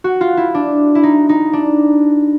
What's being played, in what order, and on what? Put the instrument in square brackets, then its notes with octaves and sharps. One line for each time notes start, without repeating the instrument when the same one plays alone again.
[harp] F#4
F4
E4
D4
E4
D#4
D#4
D4